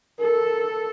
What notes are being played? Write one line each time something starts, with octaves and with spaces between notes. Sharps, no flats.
A4 A#4